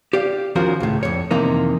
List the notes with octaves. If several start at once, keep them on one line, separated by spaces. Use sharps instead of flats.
G4 D5 F5
D#2 F3 C#4 F#4 A#4
C#2 A2
F2 C#5
F2 C3 D#3 E3 A#3 D#4